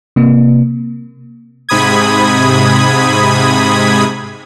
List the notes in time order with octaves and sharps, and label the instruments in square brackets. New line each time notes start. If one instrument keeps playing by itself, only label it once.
[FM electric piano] C3 A#3
[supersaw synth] G#2 C3 B5 D#6 G#6